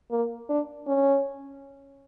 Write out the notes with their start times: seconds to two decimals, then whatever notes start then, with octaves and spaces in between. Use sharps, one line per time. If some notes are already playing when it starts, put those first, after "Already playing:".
0.11 A#3
0.49 D4
0.87 C#4